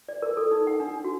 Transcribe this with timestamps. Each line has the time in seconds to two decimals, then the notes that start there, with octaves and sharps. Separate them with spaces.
0.09 D5
0.22 A#4
0.37 A4
0.51 D#4
0.67 F#5
0.80 D4
1.04 F#4